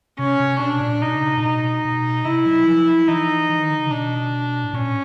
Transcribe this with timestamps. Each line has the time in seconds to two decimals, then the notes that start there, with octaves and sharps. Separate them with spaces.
0.19 C3 C#4
0.40 C3
0.60 B2 D4
0.81 A#2
1.01 B2 D#4
1.15 C#3
1.30 C3
1.37 A#2
1.43 B2 D#4
1.85 B2
2.25 C3 E4
2.46 F#3
2.67 F3
3.08 E3 D#4
3.49 E3
3.59 D#3
3.70 D3
3.80 C#3
3.90 B2 D4
4.64 A2
4.73 A#2 C#4